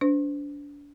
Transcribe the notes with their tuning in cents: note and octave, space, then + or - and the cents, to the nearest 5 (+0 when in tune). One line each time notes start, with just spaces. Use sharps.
D4 -30 C5 -40